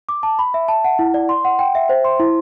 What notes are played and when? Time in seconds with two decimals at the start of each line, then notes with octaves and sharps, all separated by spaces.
0.09 D6
0.23 A5
0.39 B5
0.54 E5
0.68 A5
0.84 F#5
0.99 E4
1.14 D5
1.29 C6
1.45 F#5
1.59 G5
1.75 E5
1.89 C5
2.04 C6
2.20 E4